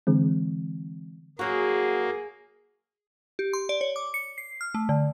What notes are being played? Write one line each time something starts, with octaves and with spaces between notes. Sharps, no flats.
D3 E3 G#3 C4
F#3 A#3 F#4 G#4
G4
C6
D5
C#5
D6
C#7
C7
F6
A3
D3